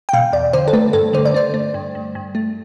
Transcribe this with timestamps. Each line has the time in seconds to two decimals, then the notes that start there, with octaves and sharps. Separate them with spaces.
0.09 G5
0.13 B2 F5
0.33 E2 D5
0.53 D3 C5
0.68 A4
0.73 A3 B4
0.93 G2 A4
1.13 D3 C5
1.25 D5
1.34 A3 C5
1.54 A3
1.74 G2
1.95 G2
2.15 G2
2.35 A3